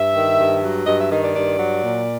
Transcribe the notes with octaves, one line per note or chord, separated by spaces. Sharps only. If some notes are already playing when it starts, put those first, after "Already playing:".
Already playing: G2 E5
D#3
G2
F#3
G2 D#5
E5
D#3 D#5
D5
G2 D5
F#3
A#2